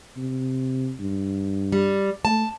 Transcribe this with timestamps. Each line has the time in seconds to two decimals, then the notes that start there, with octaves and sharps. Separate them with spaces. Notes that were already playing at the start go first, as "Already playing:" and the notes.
0.17 C3
1.00 G2
1.72 G3
2.25 A3 A5